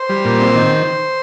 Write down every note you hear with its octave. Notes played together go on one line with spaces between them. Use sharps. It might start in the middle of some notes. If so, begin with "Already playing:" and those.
Already playing: C5
G3
A#2
C4
D#3